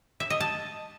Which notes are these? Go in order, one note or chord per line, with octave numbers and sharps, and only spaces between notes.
E5
D#5
A5